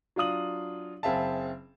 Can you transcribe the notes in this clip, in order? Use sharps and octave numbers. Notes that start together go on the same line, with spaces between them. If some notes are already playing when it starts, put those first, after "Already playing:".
F#3 D4 F4 D#6 F#7
F#1 C4 G#4 E5 F5 A5